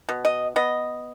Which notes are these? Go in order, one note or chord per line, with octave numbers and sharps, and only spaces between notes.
B2
D#5
B3 D#5